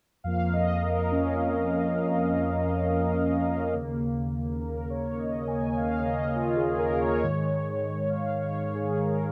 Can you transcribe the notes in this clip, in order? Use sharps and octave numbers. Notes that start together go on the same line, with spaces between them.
F2 F3 A#3 F5
D#5
A#4
C#4
D#2 C#3 A#3
A#4
C#5
D#5
G#5
F5
D#5
F4
G#4
A#4
C#5
G#2 D#3 G#3
F5
C#5
C#5
G#4
A#4